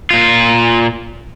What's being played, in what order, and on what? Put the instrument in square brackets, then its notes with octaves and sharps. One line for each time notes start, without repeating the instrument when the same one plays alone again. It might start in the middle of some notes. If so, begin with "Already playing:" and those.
[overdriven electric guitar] A#2 F4